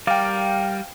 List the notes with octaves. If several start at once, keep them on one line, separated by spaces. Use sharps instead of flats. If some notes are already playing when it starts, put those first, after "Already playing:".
G3 A#4 D5 F5 G5